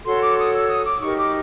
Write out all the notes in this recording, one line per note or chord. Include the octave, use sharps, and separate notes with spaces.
F#4 A4 C#5 C6
D6
D#6
E6
D#6
D6
D#4 G4 A#4 C#6
D6